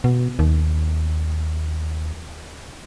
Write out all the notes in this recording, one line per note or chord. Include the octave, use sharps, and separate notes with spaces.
B2
D#2